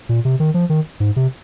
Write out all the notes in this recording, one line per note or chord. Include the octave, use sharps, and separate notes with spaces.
A#2
C3
D#3
F3
D#3
G#2
C3